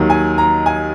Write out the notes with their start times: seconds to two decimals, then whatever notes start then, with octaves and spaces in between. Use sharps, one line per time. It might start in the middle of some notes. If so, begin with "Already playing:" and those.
Already playing: D#2 D#3 F#3
0.10 G#5
0.38 A#5
0.66 G#5